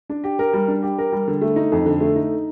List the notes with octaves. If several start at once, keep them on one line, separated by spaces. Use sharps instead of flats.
D4
G4
A#4
G3
D4
G4
A#4
G3
D3
A3
D#4
F2
D3
A3
D#4